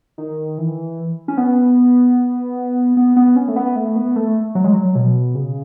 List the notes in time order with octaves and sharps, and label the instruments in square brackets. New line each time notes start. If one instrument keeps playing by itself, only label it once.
[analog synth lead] D#3
E3
C#4
B3
B3
B3
C#4
A3
B3
A3
B3
A3
F#3
G#3
F#3
B2
C#3